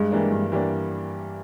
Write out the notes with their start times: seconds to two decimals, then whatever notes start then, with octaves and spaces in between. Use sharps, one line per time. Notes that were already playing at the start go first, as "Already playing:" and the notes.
Already playing: G2 G#3
0.12 E3 G3 A#3 D4
0.32 G2
0.52 E3 G3 A#3 D4